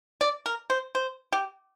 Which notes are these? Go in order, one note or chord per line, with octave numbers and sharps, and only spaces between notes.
D5
A#4
C5
C5
G4